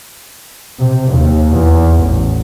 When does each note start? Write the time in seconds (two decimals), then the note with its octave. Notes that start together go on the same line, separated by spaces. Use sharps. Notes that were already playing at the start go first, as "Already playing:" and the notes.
0.78 C3
1.10 D#2
1.50 E2
1.98 A1